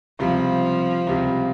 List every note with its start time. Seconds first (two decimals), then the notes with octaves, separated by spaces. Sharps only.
0.19 C#2 C3 F3 G3
1.07 C#2 C3 G3